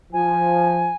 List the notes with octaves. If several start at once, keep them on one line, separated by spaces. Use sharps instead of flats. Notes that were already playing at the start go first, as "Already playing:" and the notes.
F3 G#5